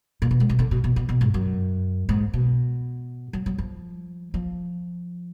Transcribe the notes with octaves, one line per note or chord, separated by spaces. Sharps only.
A#2
B2
G#3
B2
D3
B2
B2
B2
B2
G#2
F#2
G#2
B2
F#3
F#3
F3
F3